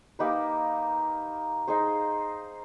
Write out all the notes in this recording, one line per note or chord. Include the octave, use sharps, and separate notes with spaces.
A#3 D#4 G4 B4
D#4 G#4 C5